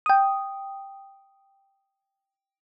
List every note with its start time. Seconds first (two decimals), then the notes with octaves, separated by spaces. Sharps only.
0.06 G5 D#6